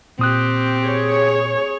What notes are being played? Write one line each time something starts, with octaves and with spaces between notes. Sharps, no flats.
A#2 C4 G4 D#6 F#6
G#4 C#5